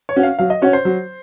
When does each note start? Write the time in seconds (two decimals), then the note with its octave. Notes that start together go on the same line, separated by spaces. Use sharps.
0.09 C#5
0.16 C#4 F#4
0.23 F5
0.39 F#3 F5
0.50 D#5
0.62 C#4 F#4 C#5
0.73 C5
0.85 F#3